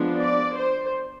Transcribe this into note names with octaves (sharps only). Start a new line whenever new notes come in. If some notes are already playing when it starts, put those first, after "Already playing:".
Already playing: F3 G#3 B3 D4
D5
C5